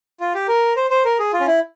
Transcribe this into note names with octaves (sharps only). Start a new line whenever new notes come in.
F4
G4
A#4
C5
C5
A#4
G#4
F4
C#4
E4